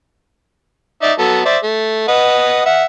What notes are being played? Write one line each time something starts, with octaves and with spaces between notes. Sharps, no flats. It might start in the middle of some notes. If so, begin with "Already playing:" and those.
D#4 D5 E5
F#3 B3 A4
C5 D5 E5
A3
B4 D#5 F#5
E5 F#5